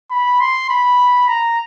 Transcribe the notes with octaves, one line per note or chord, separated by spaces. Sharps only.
B5
C6
B5
A#5